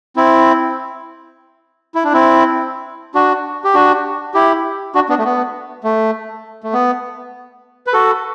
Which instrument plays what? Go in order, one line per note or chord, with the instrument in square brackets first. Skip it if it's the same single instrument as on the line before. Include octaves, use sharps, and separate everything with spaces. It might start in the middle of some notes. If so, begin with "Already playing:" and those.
[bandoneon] C4 E4
E4
D4
C4 E4
D4 F#4
G4
D4 F#4
E4 G4
D4 F#4
B3 D4
A3
B3
A3
A3
B3
B4
F#4 A4